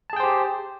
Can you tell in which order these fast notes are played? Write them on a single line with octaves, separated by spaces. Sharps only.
A5 G#4 G5 C5 G4